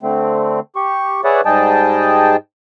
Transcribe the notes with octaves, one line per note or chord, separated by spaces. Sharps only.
D3 A3 C4
G4 C#6
G#4 B4 C#5 D5 E5 F#5
G#2 G3 G#4 D#5 G5 A5